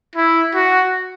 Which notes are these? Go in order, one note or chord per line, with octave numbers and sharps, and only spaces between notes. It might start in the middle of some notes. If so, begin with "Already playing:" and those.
E4
F#4